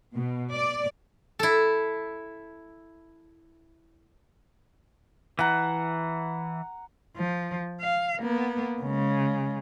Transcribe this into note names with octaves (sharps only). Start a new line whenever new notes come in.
B2
D5
E4 A4
E3 F#5 A#5
F3
F5
A#3 B3
C#3 G#3